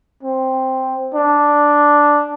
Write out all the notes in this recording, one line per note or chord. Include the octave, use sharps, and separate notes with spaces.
C4
D4